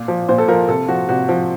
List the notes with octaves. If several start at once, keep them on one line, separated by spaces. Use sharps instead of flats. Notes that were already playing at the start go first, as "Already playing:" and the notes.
Already playing: A#2
F3
A#2 C5
A4
F3 A#4
C3 A4
F3 F#4
C3 F#4
F3